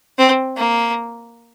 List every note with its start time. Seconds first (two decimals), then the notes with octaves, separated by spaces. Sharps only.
0.18 C4
0.57 A#3